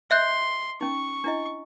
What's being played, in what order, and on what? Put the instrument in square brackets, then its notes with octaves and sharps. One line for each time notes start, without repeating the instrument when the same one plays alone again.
[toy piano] D#5 [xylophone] E5 F#6 G6 [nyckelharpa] C6
[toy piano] C#4 D#4 [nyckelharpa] C#6
[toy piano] D4 E4 D#5